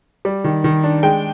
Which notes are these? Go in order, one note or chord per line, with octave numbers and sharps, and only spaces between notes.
G3
D#3
D#3
D4
G#3 G5